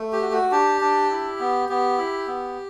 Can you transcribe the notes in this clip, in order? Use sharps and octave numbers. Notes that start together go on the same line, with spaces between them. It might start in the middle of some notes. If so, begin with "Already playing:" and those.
Already playing: A3
G4
F#4
F#4
D4 G4
D4
E4
B3
B3 G4
E4
B3